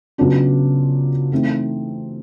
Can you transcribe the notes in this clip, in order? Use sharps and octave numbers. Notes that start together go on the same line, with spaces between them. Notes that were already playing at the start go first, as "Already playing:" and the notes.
C#3 F#3 B3 D4 F4
E3 A3 C4 D#4